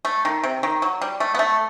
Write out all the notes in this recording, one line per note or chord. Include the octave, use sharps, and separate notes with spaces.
A3
D#3
C3
D#3
F#3
G3
A3
B3
A3